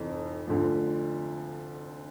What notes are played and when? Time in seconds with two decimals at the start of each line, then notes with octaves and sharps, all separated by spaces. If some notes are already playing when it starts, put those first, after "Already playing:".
Already playing: F1 F2 E3
0.47 D2 D3 F3